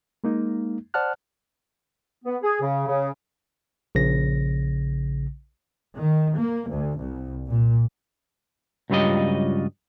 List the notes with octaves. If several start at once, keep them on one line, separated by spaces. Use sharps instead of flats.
G#3 A#3 D#4
C5 D5 F#5 A5 F6 F#6
B3
G#4
C#3
C#3
A#1 C#3 A#6
D#3
A#3
D2
C2
A#2
C#2 G2 F#3 G3 F4 D#5